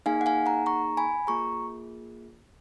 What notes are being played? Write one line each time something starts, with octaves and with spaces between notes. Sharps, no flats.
A#3 D#4 G#4 F5 G#5
F#5
F5 G#5
F#5 A#5
A#5 C#6
G#5 B5
A#3 F4 G#4 A#5 C#6